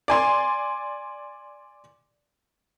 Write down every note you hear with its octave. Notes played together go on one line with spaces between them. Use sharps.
D5 G#5 C6